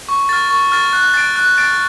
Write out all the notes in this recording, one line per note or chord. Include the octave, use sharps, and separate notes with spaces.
C#6
F6 A6
C#6
F6 A6
F#6
A6 D7
F#6
A6 D7